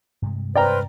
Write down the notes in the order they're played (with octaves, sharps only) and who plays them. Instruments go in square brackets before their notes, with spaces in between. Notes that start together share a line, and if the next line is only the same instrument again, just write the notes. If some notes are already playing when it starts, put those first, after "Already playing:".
[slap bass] G2 C3 G#3
[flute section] B4 C5 F6 [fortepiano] D5 G5 A#5